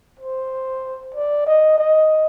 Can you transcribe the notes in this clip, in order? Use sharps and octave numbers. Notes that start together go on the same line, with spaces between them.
C5
D5
D#5
D#5